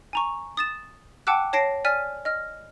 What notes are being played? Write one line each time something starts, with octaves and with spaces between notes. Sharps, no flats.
G#5 A#5 C#6
D#6 A6 E7
F#5 G5 A5 D6 E6 F#6
C#5 A5 A#6 C7 D7
D5 G#5 F6 B6 D#7
D#5 F6